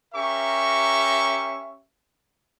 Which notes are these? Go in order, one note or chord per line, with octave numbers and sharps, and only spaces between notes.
C#4 G4 A#4 E5 A#5 C#6